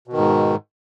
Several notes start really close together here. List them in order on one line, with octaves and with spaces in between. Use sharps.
B2 D#3 G#2